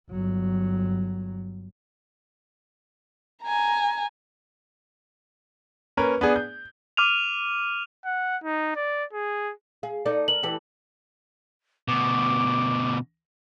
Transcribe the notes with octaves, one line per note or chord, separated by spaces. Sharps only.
G1 F#3
G#5 A#5
A#3 C#4 A#4 B4
B3 D4 G#4
G6
D6 F6 D#7 F7
F#5
D#4
D5
G#4
G#4 F5
D#4 A4 D5
A#4 F#7
E3 G4 A4
D2 B2 D6